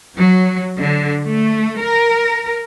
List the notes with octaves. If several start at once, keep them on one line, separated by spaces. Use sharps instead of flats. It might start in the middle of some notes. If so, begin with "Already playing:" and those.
F#3
D3
A3
A#4